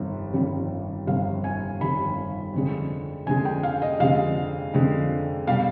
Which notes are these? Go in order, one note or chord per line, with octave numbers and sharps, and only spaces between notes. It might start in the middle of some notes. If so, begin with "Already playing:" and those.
Already playing: G1 F2 D#3 G3
G1 F2 D#3 G3
G1 F2 D#3 G3 F5
G#5
G1 F2 D#3 G3 B5
F2 D3 G#3
F2 D3 G#3 G#5
G5
F5
D#5
F2 D3 G#3 F5
F2 D3 G#3
B2 G3 F5